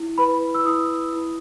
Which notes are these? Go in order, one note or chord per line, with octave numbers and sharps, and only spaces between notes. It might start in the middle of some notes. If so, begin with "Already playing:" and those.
Already playing: E4
B4 B5
E6
E4 D#6
E4